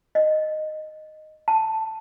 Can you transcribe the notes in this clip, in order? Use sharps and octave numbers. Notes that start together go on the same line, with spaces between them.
D#5
A5